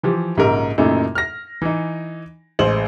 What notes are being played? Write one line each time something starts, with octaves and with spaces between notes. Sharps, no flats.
E3 F3 G4
A#1 G#2 C#3 G4 A#4
F#2 A#2 C#3 A3 D#4 E4
F6 A#6
E3 D#4
A1 G#3 C5 F#7